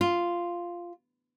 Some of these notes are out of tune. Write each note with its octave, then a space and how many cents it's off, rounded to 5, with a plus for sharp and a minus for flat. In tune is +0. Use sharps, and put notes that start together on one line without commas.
F4 -5